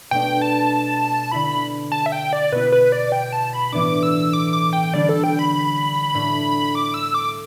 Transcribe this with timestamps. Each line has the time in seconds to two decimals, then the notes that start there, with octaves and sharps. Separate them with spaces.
0.11 B2 A3 D4 G5
0.42 A5
1.31 D3 A3 E4 B5
1.92 A5
2.06 E5
2.12 G5
2.33 D5
2.52 B2 B3 E4 B4
2.72 B4
2.92 D5
3.12 G5
3.32 A5
3.53 B5
3.72 A2 E3 B3 D4 D6
4.03 E6
4.33 D6
4.53 D6
4.73 G5
4.94 D3 G3 D4 D5
5.09 A4
5.24 G5
5.39 B5
6.14 A2 A3 D4
6.75 D6
6.94 E6
7.14 D6